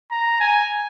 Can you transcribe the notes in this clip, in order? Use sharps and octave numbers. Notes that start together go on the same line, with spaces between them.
A#5
G#5